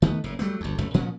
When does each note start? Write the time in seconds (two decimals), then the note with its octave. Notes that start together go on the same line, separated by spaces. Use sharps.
0.02 D#3 A3 B3
0.24 F#1 A2
0.39 F#3 G3 A3 B3
0.61 G1 D2
0.78 F1 C#2 F#2 A3
0.94 A#2 F3 F#3 C#4